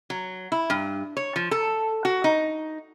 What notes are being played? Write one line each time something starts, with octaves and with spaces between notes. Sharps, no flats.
F#3
E4
G2
C#5
F3
A4
F#4
D#4